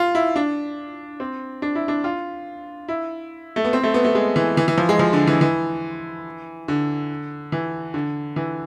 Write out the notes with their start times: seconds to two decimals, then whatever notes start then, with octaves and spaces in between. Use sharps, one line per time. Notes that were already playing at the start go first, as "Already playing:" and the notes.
Already playing: F4
0.15 E4
0.36 D4
1.20 C4
1.62 D4
1.75 E4
1.88 D4
2.04 F4
2.88 E4
3.56 A3
3.64 B3
3.73 C4
3.83 A3
3.94 B3
4.05 A3
4.15 G#3
4.36 E3
4.57 E3
4.68 E3
4.78 F3
4.89 G#3
4.99 F3
5.13 D3
5.27 E3
5.41 E3
6.68 D3
7.52 E3
7.94 D3
8.36 E3